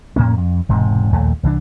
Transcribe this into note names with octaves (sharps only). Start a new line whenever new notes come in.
F2 A2 A#3 C#4
F2
E1 G#2 C3
A#1 D#2 A3
C2 E3 G#3 D4